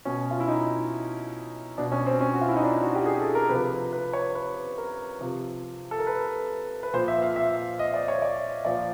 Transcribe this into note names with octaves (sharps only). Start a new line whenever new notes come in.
B2 C#4
F4
E4
D#4
B2 D4
C#4
C4
C#4
F#4
F4
E4
D#4
D4
F#4
G4
G#4
A4
A#4
C3 F3 B4
B4
C#5
B4
A#4
C3 F3
A4
A#4
B4
B4
A#2 F3 C5
E5
F5
E5
D#5
D5
C#5
D5
A#2 F3 D5